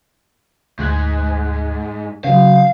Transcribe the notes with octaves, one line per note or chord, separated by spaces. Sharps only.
D2 G#2 F#6 G#6
C#3 F#3 F5